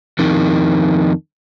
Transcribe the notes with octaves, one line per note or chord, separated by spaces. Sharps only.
F2 D#3